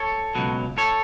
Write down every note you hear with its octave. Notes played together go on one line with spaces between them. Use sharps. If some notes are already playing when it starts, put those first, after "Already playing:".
Already playing: A4 C#5
C#2 B2 F#3
A4 C#5